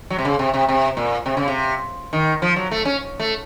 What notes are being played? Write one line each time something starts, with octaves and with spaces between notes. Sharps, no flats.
F#3
C3
C#3
C3
C3
C3
A#2
C3
C#3
C3
D#3
F3
F#3
A3
C#4
A3